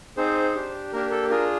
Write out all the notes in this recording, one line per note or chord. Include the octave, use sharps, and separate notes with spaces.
C4 D#4 G#4 C5
D4 G4
A#3 D4 G4 A#4
A4
D4 F4 G#4 A#4